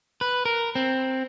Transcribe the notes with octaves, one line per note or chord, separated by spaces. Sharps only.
B4
A#4
C4